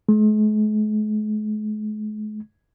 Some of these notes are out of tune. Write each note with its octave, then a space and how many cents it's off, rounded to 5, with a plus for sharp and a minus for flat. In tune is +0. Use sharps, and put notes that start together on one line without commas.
G#3 +45